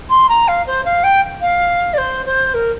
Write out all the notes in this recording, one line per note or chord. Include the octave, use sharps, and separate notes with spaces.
C6
A#5
F5
C5
F5
G5
F5
D5
C5
C5
A#4